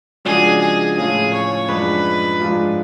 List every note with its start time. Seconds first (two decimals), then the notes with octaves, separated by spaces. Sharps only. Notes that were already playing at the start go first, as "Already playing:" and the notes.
0.25 C#3 F3 G#3 D4 F#4 G#4
0.61 G#4
0.97 A2 F3 A3 C#4 F4 G#4
1.33 C#5
1.69 F#2 F3 G#3 D4 B4
2.40 G#2 F3 G#3 D4 F4